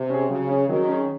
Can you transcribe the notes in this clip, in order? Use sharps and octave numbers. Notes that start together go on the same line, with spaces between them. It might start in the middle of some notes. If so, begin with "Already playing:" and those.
Already playing: C3
C#4 G#4
C#3 F#3
C#4 G#4
D#3 F#3
C#4 G#4